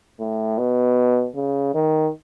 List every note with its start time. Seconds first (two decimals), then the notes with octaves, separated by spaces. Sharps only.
0.20 A2
0.58 B2
1.35 C#3
1.74 D#3